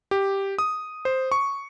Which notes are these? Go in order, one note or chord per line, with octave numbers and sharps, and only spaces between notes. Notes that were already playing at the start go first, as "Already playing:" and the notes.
G4
D#6
C5
C#6